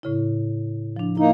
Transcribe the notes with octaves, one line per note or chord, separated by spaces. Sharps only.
A2 C#3 E4
F3 D4
A#3 D#4 E4